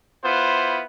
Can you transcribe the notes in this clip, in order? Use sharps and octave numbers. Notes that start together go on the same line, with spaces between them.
B3 E4 F4 C5